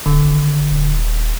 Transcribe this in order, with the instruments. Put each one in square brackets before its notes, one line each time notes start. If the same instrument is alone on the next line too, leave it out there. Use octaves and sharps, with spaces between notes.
[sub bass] D1 [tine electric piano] D3
[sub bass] G#1
D#1